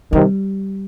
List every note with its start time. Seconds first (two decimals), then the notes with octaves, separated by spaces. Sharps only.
0.13 C3 D#3 G3